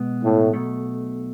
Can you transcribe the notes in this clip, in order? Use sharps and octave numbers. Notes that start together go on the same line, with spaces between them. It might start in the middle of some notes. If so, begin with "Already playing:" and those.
Already playing: B2 G#3 B3
A2
B1 B2 A3